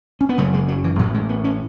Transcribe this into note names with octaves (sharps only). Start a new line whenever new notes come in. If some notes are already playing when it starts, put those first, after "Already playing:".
C#4
B3
F#1 F#2 C#3 A3
G#3
F#3
E3
A1 A2 F#3
G#3
B3
C#4